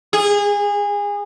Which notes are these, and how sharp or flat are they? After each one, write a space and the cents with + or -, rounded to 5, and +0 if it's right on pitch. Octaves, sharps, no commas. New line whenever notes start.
G#4 -25